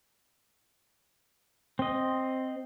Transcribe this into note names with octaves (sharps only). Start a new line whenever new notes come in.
C4 D#5